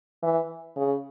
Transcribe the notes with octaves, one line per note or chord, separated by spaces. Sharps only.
E3
C#3